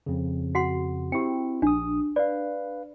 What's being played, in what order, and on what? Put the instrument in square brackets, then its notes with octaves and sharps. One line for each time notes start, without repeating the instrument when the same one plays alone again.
[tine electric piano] F2 C#3
[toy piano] F#4 F#5 C6
[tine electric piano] C4 E4 [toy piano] G4 G5
[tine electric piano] A#1 D#6 [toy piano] D4
[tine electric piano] B4 F5 [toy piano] D5